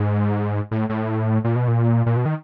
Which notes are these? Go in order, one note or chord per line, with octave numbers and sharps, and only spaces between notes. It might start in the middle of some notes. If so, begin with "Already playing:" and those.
Already playing: G#2
A2
A2
A#2
B2
A#2
A#2
B2
D#3